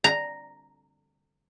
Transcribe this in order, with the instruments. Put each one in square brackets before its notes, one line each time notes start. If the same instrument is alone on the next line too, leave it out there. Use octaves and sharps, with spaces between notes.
[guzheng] A#5